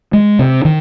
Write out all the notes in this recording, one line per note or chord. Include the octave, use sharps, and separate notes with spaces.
G#3
C3
D#3